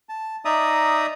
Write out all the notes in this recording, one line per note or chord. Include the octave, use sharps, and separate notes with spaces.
A5
D#4 D5 E5 A#5 D#6